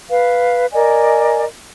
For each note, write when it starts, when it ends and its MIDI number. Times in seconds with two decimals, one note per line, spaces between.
0.09 0.66 71
0.09 0.66 77
0.73 1.43 70
0.73 1.43 74
0.73 1.43 75
0.73 1.43 80